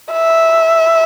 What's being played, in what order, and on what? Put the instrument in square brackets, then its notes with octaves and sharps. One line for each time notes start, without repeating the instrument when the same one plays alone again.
[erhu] E5